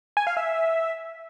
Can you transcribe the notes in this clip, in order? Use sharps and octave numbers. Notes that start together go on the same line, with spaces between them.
G#5
F5
E5